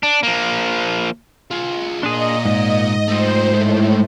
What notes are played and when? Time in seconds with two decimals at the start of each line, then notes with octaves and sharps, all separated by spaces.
0.03 D4
0.23 F3 A#3
1.51 F4 G#4
2.03 A#2 D4 G#4 D#5 C6
2.45 G#2
3.08 A3 F4 C5
3.53 A2 G#3 A3